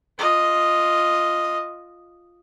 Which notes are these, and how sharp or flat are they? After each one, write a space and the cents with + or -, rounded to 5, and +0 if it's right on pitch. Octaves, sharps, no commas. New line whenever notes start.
F4 +0 D#5 +0